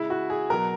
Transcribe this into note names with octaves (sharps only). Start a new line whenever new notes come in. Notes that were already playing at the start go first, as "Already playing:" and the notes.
Already playing: C#3 G#3 E4
F#4
G#4
B2 F#3 A#4